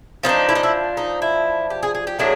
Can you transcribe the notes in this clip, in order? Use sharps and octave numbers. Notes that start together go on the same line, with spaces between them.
F3 A#3 D#4
D4
E4
D#4
E4
D#4
E4
G4
G#4
G#4
G4
A2 F#3 A#3 D4 G#4